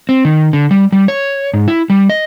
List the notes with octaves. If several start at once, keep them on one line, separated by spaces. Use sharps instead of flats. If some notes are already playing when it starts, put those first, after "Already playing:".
C4
D#3
D3
G3
G3
C#5
G#2
E4
G3
D#5